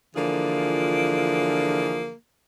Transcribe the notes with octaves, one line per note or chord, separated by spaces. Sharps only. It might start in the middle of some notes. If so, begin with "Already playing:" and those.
D3 E3 F3 A#3 F4 G#4